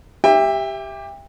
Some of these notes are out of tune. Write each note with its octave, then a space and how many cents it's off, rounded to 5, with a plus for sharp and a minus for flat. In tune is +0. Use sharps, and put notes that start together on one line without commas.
G4 +0 E5 +0 G5 +35